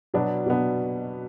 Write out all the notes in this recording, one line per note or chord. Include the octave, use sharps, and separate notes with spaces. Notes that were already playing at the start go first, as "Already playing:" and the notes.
B2 F#3 B3 D4
B2 F#3 B3 D4